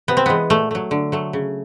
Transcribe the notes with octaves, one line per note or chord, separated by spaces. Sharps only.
C3 B3
C4
E3 G#3 B3
A#2 A3
F#3 A3
D3
F#3 A3
C#3